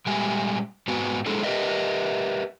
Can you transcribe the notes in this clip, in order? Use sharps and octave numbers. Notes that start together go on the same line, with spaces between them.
A#2 G3 G#3 G4 E5 G#5
G#2 B3 C4 F#4 G#5
G#3 D4 E4 G#4 A4
G4 A#4 B4 D#5 E5